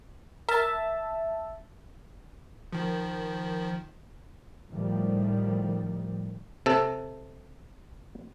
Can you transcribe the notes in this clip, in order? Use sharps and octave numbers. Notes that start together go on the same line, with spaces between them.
A#4 E5 A5
D#3 F3
A2 D#3 F3 G3
C3 A4